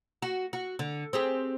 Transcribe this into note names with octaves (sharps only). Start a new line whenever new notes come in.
F#4
F#4
D3
C4 G4 G#4